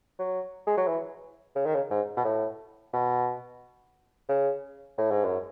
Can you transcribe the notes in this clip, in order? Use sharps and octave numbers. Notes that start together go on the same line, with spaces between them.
F#3
G#3
F#3
E3
C#3
D#3
C#3
G#2
B2
A2
B2
C#3
A2
G#2
F#2